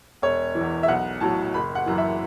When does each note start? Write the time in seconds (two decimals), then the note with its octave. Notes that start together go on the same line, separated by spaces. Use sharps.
0.22 E1 C#5
0.55 E3
0.61 E2
0.83 E5
0.88 B1 F#5
1.20 A2 F#3 A5
1.54 F#1 B5
1.75 F#5
1.86 F#2 E3
1.98 E5